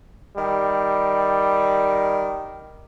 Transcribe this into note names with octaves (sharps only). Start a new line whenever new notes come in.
D#3 G3